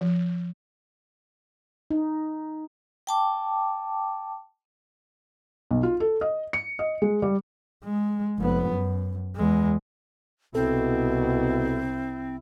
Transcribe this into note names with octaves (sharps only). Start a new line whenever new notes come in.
F3
D#4
G5 A5 D6
B1
F4
A4
D#5
C#7
D#5
G#3
G3
G#3
F1 B3
F#2
E2 G#3
C2 B2 C4 E4 A4